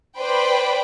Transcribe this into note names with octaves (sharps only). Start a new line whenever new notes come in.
B4 C5 D5 G5 B5